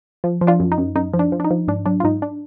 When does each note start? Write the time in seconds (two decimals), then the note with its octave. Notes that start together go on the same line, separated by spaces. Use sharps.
0.24 F3
0.41 F3
0.47 D4 F4
0.60 F#2
0.72 D#4
0.78 F#2
0.96 F#2 D#4
1.14 F3
1.19 D4
1.32 F3
1.40 D4
1.45 D#4
1.51 F3
1.68 G#2 D4
1.86 F#3 D4
2.00 F4
2.04 G#2 D#4
2.22 D4